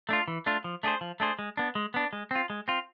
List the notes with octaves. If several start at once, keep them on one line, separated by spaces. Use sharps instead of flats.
A3 D4 F4
E3
A3 D4 F4
F3
A3 D4 G#4 C5
F3
A3 D4 G#4 C5
G#3
B3 D4
G#3
B3 D4
G#3
C4 F4
G#3
C4 F4